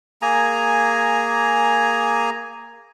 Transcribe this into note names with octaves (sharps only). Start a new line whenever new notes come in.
A#3 G#4 G#5 A#5